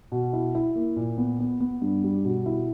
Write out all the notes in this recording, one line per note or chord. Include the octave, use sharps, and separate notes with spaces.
B2
E4
E4
A#3
A#2
B3
B3
B3
G2
G3
B2
E4